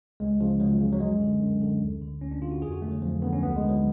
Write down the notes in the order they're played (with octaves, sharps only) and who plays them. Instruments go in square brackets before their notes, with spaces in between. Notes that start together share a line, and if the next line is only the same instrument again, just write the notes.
[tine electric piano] C#2 G#3
C#3 F3
C#2 F#3
C#3
F#3
F#2 G#3
D3
F#2
D3
D2
D3
D2 C#4
D4
D3 F4
F#4
F2 G#4
F#4
D3 A3
F#3
F2 F3
D3 B3
C#4
D2 B3
G#3
D3
F#3